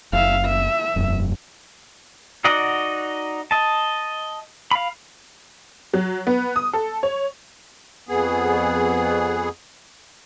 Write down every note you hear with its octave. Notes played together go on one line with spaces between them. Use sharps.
F#1 E5 F5
E5
E1 F#2
D#4 F#4 D5 D#5 F#5
D#5 A5
F5 B5
F#3
B3
D#6
A4
C#5
F2 B3 G#4